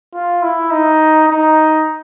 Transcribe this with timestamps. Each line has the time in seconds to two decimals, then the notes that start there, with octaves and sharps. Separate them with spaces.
0.14 F4
0.43 E4
0.71 D#4
1.28 D#4